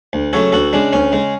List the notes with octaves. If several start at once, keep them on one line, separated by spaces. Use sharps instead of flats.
D2
C#3 F#3 A3 A4 C#5
D2 F#4 A4
C#3 G#3 D4
D2 C#4
C#3 G#3